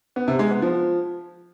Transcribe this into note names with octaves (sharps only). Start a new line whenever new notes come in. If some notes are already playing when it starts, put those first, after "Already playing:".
B3
C3
G#3
B3
F3